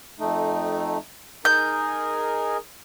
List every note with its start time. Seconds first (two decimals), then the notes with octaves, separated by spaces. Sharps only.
0.20 F2 A3 D#4
1.45 D#4 G#4 A#4 G6